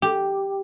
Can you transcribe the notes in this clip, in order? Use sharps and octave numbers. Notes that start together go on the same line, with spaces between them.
G4